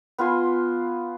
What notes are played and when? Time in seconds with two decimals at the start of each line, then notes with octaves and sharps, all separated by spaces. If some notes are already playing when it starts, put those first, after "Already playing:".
0.18 B3 F4 G#5 C6